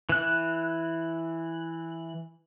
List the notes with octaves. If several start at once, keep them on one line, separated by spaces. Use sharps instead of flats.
E3 F#6